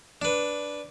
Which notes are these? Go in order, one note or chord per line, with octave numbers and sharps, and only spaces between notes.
D4 B4